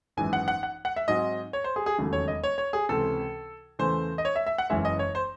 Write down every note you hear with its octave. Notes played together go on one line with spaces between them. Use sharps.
G#1 F#2 E3 G#3 G#5
F#5
F#5
F#5
F#5
E5
G#2 F#3 C4 D#5
C#5
C5
G#4
G#4
E1 D#2 C#3 F#3 A3
C#5
D#5
C#5
C#5
G#4
C#2 C3 E3 C4 A4
E2 C#3 E3 A3 C5
D#5
C#5
E5
E5
F#5
F#1 F#2 E3 G#3 C#4 E5
D#5
C#5
C5